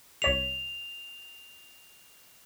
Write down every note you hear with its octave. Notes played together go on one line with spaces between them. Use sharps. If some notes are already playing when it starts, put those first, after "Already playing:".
C2 C#5 B6 F7